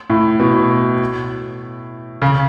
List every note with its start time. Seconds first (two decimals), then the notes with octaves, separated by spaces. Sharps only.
0.10 A2
0.40 B2
2.22 C#3